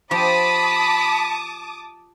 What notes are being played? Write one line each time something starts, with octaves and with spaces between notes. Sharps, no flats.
F3 G4 A5 B5 D6 D#6